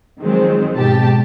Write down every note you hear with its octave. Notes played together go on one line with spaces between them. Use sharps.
D#3 F3 F#3 G#3 C4
G#2 B2 G4 A5